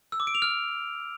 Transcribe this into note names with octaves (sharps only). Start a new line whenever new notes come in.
E6
D6
D7
F7
F6